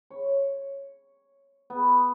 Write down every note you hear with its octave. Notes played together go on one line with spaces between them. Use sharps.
C#5
B3